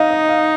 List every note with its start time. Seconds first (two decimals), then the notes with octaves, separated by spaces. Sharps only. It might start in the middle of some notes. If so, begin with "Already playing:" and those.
Already playing: D#4 D#5 F5
0.10 D#5
0.29 F5